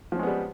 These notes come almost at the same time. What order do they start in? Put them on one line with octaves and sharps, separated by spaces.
F3 C#4 G#3 B3 G3